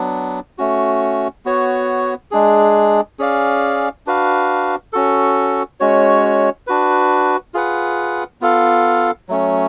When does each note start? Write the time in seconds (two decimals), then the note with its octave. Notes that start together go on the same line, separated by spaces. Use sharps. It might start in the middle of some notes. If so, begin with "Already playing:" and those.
Already playing: F#3 B3 D4
0.58 A3 C#4 F#4
1.45 B3 F#4 C#5
2.31 G#3 D4 G#4
3.19 C#4 G#4 D5 F5
4.06 D4 F#4 B4 F5
4.93 C#4 F#4 A4
5.80 G#3 C#4 F#4 C#5
6.67 D4 F#4 B4
7.54 F4 G#4 B4 F#5
8.41 B3 F4 A4 F5
9.28 F#3 A3 C#4